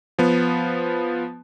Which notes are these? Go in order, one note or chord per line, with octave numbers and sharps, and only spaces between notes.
F3 B3